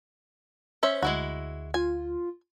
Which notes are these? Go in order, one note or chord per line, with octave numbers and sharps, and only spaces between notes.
C#4 C5 E5
D2 G#3 E4 F#4
F4 G#5